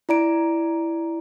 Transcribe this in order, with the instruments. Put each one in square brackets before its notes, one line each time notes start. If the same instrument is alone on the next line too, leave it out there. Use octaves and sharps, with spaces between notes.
[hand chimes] E4 D5 A#5 D7